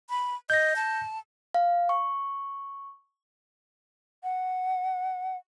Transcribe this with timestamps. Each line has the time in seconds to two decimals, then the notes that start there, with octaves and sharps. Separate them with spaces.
0.10 B5
0.50 D#5 G6 A#6
0.76 A5
1.54 F5
1.89 C#6
4.23 F#5